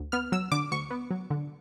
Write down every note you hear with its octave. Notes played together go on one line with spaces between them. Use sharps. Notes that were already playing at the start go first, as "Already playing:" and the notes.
Already playing: D2
B3 F6
F#3 E6
D3 D6
D2 C#6
B3
F#3
D3